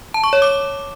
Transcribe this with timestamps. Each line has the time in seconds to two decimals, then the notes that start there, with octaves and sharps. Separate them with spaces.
0.14 A5
0.24 C#6
0.33 C#5
0.42 D6